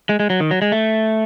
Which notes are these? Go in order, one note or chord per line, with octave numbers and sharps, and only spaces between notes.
G#3
G#3
F#3
D#3
F#3
G#3
A3